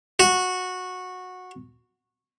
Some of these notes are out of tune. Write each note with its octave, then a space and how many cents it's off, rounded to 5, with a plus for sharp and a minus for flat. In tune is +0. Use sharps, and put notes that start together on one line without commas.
F#4 -15